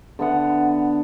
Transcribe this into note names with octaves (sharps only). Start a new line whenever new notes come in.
D3 B3 F#5